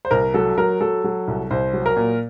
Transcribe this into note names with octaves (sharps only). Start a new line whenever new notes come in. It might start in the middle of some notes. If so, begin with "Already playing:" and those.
C5
C2 A#4
F#3 A4
F#3 A#4
F#3 A4
F#3
C2
C2 C5
F#3
A#4
A#2